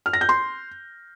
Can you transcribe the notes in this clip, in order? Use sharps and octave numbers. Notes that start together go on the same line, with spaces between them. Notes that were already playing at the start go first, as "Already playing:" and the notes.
F6
A#6
G6
C6